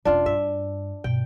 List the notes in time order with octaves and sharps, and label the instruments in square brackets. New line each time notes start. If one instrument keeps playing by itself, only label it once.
[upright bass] E1 C#4 [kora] D4 F4
[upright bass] G2 [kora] E5
[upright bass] G2 B2 [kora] G5